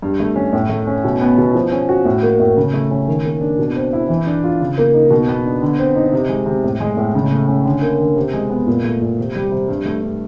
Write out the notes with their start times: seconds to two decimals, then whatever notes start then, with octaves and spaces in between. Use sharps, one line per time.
0.02 G2
0.20 A3
0.36 C#4
0.53 A2
0.69 A3
0.87 C#4
1.04 B2
1.21 B3
1.38 B2
1.54 F3
1.72 C#4
1.89 F#4
2.05 A2
2.22 A#3
2.40 A2
2.57 C#3
2.74 A3
2.91 C#4
3.08 D#3
3.25 A#3
3.41 D4
3.59 B2
3.76 C4
3.93 E4
4.09 E3
4.27 D4
4.44 F4
4.61 C#3
4.78 A#3
4.94 D#4
5.10 B2
5.28 B3
5.45 D4
5.62 D3
5.78 C4
5.96 D#4
6.13 C3
6.29 G#3
6.46 C3
6.64 A2
6.80 G#3
6.97 A2
7.15 C#3
7.32 A3
7.48 C#4
7.65 D3
7.82 A#3
8.00 D3
8.16 C3
8.33 G#3
8.49 B3
8.67 A#2
8.84 A3
9.02 A#2
9.19 C3
9.35 G3
9.52 C3
9.68 G2
9.85 A3
10.02 G2